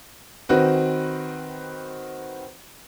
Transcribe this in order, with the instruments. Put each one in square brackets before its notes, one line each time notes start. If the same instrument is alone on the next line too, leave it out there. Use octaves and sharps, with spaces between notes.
[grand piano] D#3 C4 F#4 B4